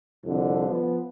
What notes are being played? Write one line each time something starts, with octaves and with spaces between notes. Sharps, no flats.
C2 F2 D3
F3 B3